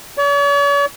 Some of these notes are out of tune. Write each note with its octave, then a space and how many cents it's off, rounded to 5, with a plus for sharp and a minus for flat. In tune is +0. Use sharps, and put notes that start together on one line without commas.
C#5 +45